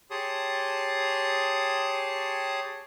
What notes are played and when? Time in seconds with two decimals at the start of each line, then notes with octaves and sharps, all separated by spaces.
0.11 G4 G#4 C#5 A5 C6 D#6